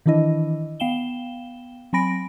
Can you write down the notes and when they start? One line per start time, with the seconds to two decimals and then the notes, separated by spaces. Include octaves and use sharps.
0.06 D#3 E3 D4 E4 D#5
0.80 B3 F5 G5 E7 G7
1.93 F#3 C4 G#5 B5 A#6 D7